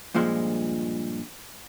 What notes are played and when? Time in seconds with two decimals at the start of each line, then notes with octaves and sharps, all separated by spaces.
0.15 G2 A#2 F3 G#3